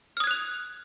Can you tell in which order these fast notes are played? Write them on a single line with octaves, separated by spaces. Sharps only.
F6 D#6 G#6 F#6 F7